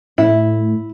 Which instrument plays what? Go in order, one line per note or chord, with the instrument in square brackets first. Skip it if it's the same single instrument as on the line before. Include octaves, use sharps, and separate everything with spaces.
[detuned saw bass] A2 [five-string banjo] E4